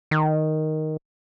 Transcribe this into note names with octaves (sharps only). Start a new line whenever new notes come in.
D#3